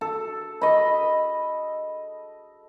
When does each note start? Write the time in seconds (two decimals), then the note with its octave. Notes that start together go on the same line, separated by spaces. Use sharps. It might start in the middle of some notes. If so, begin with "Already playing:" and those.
0.01 A4
0.61 D#5 B5